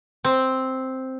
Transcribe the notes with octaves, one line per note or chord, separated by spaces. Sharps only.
C4